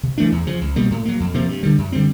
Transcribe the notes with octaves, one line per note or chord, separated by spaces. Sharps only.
C3
E3 A3 D4
E2
C#3 F3
C#2
B2 G3 A#3
A2
F#3 A#3
F2
C3 F3 A#3
G2
D3 G3
F#2
D3 G3 C4